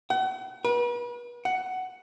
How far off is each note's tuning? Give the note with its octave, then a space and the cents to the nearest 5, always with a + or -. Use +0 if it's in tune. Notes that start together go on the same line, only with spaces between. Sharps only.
F#5 +40
B4 -40
F#5 +10